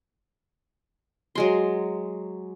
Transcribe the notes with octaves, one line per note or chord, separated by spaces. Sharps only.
F#3 G#3 C6